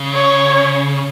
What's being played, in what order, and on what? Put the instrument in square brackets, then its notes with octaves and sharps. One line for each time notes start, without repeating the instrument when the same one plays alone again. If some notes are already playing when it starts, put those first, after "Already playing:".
Already playing: [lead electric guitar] C#3
[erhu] C#5